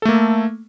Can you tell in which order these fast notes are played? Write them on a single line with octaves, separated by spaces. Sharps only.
A4 A3 A#3